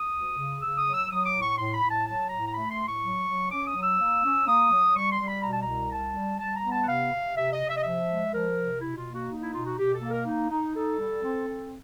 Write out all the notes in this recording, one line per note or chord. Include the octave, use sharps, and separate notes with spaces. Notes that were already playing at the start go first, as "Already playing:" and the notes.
Already playing: D#6
D2
C#3
C#3 E6
D#6
F#3
E6
F#3 D#6
D6
A2
C#6
A2 C6
B5
A2
A5
F#3 A5
A2 A#5
A#5
A3 B5
C6
A2
C#6
F#3
F#3
C#4 D6
D#6
F#3
E6
A#3
C#4
A#3 D#6
F#3
G3 C#6
C6
G3
B5
B2 A#5
A5
C2 A#5
G3 A5
G3
G3 A5
A#5
B3
A5
F#5
C3 F5
C3
C3 E5
D#5
C3
E5
D#5
F3 E5
G#3
F3 A#4
C3
B2 E4
F4
A#3
F#4
D#4
E4
B2 F4
F#4
B2 G4
A4
A#3
A#4
D#4
D#4
D#4 A4
G3
C4
C4